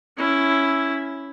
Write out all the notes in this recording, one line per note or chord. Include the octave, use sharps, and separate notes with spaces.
C#4 E4